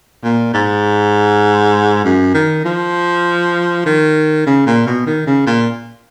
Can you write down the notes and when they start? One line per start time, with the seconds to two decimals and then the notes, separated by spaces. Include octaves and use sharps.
0.24 A#2
0.54 G#2
2.05 F#2
2.34 D#3
2.65 F3
3.86 D#3
4.47 C#3
4.66 A#2
4.87 B2
5.07 D#3
5.27 C#3
5.46 A#2